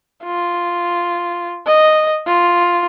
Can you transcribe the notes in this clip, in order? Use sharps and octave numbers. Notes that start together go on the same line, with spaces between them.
F4
D#5
F4